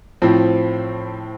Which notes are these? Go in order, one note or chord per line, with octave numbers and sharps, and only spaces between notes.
A2 F3 C4